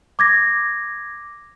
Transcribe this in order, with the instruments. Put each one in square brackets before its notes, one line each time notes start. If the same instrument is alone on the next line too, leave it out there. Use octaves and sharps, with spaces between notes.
[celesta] D6 G#6 A#6